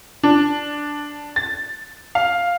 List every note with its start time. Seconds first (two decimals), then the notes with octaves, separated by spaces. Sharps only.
0.23 D4
1.36 A6
2.15 F5